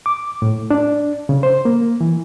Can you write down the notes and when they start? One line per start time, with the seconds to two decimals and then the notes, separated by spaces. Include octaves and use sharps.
0.06 D6
0.42 A2
0.71 D4
1.29 C#3
1.43 C5
1.65 A#3
2.01 E3